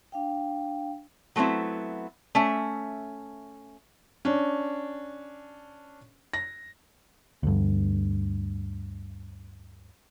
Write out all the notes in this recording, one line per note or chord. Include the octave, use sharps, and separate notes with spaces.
D4 F5 G5
F#3 A3 B3 C4 E4
A3 C#4 E5
C#4 D4
A#6
D2 G2